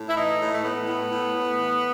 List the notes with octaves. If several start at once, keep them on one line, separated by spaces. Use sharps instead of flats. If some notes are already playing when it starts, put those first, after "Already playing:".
Already playing: A2
E4
E3 D#4
A2
A3
A2 B3
A2
A2
A2
E3